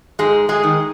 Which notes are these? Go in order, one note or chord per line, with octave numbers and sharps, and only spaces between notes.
G#2 G#3 G#4
G#3 G#4
D#3